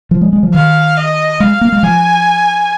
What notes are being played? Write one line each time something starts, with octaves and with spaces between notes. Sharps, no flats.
F3
G#3
G#3
F3
D#3 F5
D#5
G#3 F5
A#3
G#3
F3 G#5